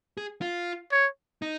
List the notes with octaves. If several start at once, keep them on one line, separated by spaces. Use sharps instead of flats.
G#4
F4
C#5
D#4